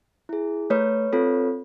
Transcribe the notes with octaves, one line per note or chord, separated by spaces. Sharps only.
E4 G#4
A3 B4 C#5
C4 F4 A4